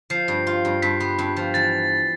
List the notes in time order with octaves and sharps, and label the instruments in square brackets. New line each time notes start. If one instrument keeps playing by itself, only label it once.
[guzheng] F3 [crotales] C7
[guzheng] G2
F4
G2
[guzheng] G2 [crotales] B6
[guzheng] B3
G2
F3
[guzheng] E3 [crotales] A6